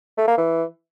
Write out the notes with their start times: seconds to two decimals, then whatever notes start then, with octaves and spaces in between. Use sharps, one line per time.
0.18 A3
0.28 A#3
0.38 E3